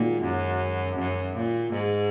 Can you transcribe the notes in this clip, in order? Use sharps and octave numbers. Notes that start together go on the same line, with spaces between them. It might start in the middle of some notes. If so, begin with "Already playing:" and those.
Already playing: A#2 D#3 G#3 D#4 F#4
F#2
F#2
A#2
G#2